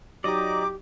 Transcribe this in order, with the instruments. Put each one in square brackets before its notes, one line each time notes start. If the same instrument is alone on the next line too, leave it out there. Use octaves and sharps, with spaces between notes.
[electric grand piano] F#3 D#4 A#5 [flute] G4 [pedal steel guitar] D5 D#5 [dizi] D6